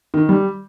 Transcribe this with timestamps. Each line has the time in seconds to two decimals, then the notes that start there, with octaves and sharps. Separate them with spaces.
0.14 D#3
0.29 G3